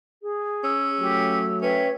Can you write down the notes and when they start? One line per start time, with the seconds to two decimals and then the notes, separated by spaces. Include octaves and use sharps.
0.22 G#4
0.64 C#4 E6
1.00 F#3 A3 G4
1.62 C#4 B4 C#5 E5 G5